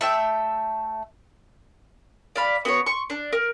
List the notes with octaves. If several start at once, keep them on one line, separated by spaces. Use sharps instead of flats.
A3 E5 G5
D5 F5 B5
B3 F#4 C5 C#5
C6 C#6
D4
A#4